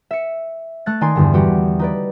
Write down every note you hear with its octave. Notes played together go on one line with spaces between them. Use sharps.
E5 C#7
A3 F#6 A6
D#3 D#4 D5 G#5 C6
E2 G2 D3
E3 G3 F#4 G4
D#4 B4 D5